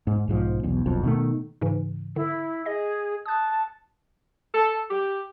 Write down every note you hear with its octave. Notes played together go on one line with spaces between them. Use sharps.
G#2
B1 G#2 E3 F3
B1 E2
D#1 B1 F2
B2 D#3 A3
G#2 C#3 E3
D3 E4
G#4 D#5 A#6
A5 D#6 F#6
A4
G4